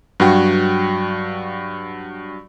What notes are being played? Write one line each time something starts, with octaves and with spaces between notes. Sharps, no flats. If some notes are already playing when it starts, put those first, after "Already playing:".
G2 F#3 F#4 G5